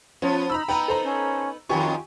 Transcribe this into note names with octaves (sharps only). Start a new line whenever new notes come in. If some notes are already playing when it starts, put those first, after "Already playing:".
F3 B3 C#4 F4
D#4 A#5 B5 E6
B3 D#4 B4 G5 A#5 B5
A4 C5 A#5
C#4
F2 D#3 B3 F4 G4 G#5 C#6